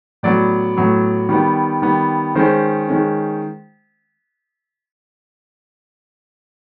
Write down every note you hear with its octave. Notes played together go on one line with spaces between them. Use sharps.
A2 F#3 B3 D5
A2 F#3 B3
D#3 G3 B3
D#3 G3 B3
D#3 G#3 C#4 C5
D#3 G#3 C#4